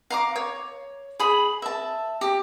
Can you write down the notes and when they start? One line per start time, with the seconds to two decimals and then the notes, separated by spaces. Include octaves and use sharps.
0.10 F5 A#5 D6
0.36 C#5
1.19 G#4 B5
1.62 E5 A5
2.21 G4